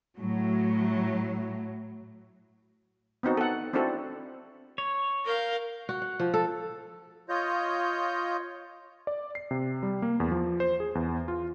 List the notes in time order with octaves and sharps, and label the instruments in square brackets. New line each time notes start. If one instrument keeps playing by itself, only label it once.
[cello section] A2 F#3
[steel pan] B3 C4 D#4 F#4
A4 F#5
C4 D4 E4 F#4 A4 D5
[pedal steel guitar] C#5
[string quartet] A#4 F5 G6
[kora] F#4
F#5
F3
A4
[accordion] F4 C#5 D#5 G6
[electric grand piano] D5
C7
C3
G3
A#3
E2
F3
C5
G#4
E2
F4